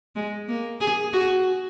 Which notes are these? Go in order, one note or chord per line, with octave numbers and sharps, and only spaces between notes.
G#3
A#3
G#4
F#4